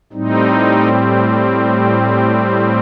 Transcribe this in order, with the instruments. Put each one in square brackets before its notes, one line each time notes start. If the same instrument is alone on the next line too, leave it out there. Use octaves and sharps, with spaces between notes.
[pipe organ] A2 G3 C4 D#4